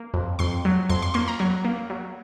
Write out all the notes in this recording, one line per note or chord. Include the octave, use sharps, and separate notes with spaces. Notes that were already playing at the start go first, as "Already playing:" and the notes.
Already playing: A#3
F2
F2 C6
F#3
F2 C6
C6
A#3 C6
A#5
F#3 C#6
A#3
F#3